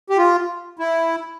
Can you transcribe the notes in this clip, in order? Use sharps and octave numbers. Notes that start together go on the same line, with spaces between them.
G4
F4
E4